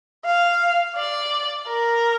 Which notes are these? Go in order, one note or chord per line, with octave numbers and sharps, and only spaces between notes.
F5
D5
A#4